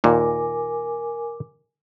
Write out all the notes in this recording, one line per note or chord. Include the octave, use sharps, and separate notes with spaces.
D#2 A#2 A#4 G#5 D6